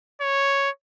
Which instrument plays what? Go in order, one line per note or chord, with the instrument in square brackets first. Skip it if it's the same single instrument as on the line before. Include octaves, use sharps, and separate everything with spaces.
[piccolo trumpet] C#5